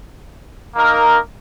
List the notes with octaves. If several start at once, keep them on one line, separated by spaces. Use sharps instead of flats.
A#3 D#4 A#4